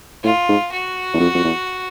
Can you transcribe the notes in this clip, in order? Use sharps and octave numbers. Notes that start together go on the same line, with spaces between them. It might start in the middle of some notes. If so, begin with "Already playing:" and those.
A2 F4
G#2
F#4
E2
F2
F2
E2